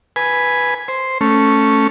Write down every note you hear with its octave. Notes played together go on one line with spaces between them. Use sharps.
B4 G#5
C5
A3 C#4